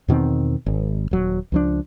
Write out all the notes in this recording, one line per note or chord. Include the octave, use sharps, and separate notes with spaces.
E2 B2 D#3 C4
G#1
D#1 F#3
C#2 F3 D4